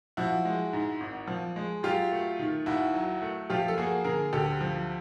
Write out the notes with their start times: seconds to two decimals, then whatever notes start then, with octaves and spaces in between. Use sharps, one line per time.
0.17 F3 E4 F#4
0.45 G#3
0.73 G#2
1.00 G#1
1.28 F3
1.56 G#3
1.83 F#3 F4 G4
2.11 A3
2.39 D#3
2.66 D#2 E4 F#4
2.94 F#3
3.22 A3
3.50 F3 F4 G4
3.68 A4
3.78 A#3 F#4 G#4
4.04 D3 G#4 A#4
4.33 D2 G4 A4
4.61 F3